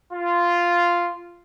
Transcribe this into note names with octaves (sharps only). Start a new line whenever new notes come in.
F4